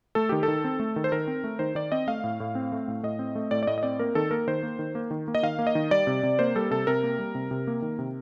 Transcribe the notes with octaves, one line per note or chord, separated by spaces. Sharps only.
A3 A4
D#3 G4
A4
D#3
C4
A3
D#3
C5
D#3 A#4
C4
A3
D#3 C5
D#3 D5
C4 D#5
A3 F5
A2
A2
C4
A3
A2
A2 D#5
C4
A3
A2 D5
D5
A2 D#5
D#5
C4 D5
A#3 A#4
D#3 A4
A#3 A#4
D#3 C5
A#3
D#3
A#3
D#3
A#3
D#5
D#3 F5
A#3
D#5
D#3
G3 D5
C3
C3
A#3 C5
G3 A4
C3 A4
C3 A#4
A#3
G3
C3
C3
A#3
D#3
C3